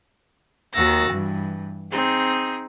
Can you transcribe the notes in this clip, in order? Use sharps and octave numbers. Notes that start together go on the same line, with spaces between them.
D#2 D#3 F#4 E6 A6 A#6
G2 E3
C4 D#4 G#4